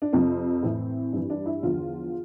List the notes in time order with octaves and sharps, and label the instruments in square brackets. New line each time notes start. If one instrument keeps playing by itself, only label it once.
[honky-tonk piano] D4
F2 C3 F3 C4
A2 E3
G2 E3
D4
E4
E2 D3 F3 F4